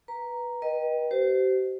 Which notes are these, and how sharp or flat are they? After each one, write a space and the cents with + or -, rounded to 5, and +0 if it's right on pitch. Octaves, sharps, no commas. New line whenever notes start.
B4 -5 A#5 +0
B4 -45 D#5 -5 G5 +0
G4 -40 C5 -15